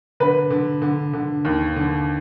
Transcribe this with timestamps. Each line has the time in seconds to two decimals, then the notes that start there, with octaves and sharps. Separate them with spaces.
0.20 D3 B4
0.51 D3
0.82 D3
1.13 D3
1.45 D#2
1.76 D3